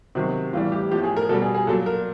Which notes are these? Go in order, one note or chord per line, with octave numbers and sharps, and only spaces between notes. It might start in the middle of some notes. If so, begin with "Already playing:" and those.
C3 D#3 F#3 F#4
A2 E3 G3 F4
G4
A2 F3 G4
G#4
A#4
B2 G3 A4
G#4
G#4
A#2 F#3 A4
A#4